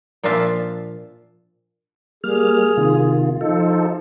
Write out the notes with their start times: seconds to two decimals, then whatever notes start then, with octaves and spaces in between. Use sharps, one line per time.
0.23 A#2 F3 D4 F4 E5 A5
2.24 G3 A#3 G#4 F6
2.77 C3 D#3 F4
3.41 F3 D#4 F4 A4